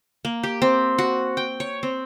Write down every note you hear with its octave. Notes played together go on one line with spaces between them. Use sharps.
A#3
G4
C4
F#4
G5
C#5
C4